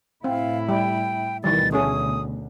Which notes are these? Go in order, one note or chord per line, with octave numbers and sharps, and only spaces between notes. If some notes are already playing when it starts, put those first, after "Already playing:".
A2 C4 E4 F5
G3 G5
D2 B2 D#3 E3 G3 A6
A3 C#4 G#4 D#6